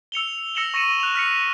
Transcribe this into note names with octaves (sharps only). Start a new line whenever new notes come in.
E6 C#7 F7 G7
E6 A#6 C#7 E7 F#7 G7
C#6 A#6 C#7 D#7 E7
F#6 F7
F6 B6 C#7